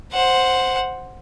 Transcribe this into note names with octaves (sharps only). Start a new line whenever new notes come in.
C5 F#5